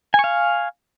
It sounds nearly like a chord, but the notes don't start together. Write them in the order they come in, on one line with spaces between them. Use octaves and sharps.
G#5 C#6 F5